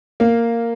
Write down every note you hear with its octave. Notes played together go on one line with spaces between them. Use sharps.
A#3